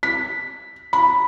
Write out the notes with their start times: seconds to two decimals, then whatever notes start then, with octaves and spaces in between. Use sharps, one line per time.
0.03 B6
0.93 B5